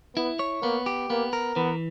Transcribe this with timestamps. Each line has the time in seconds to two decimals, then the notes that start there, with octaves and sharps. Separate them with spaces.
0.16 B3 E4
0.39 C#5
0.62 A#3 B3
0.86 G4
1.10 A#3 B3
1.33 A#4
1.56 E3 B3